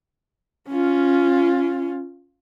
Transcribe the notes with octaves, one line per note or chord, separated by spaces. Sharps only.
C#4 F4